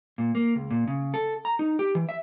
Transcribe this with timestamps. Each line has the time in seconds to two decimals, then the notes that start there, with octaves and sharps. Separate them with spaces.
0.18 A#2
0.35 A#3
0.56 C#2
0.70 A#2
0.88 C#3
1.14 A4
1.45 A#5
1.59 D#4
1.79 G4
1.95 E3
2.09 E5